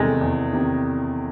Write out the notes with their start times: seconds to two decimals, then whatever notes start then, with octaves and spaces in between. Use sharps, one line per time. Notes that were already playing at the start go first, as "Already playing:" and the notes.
Already playing: E2 C3 D#3 G#3 A3
0.21 E2
0.53 C3 D#3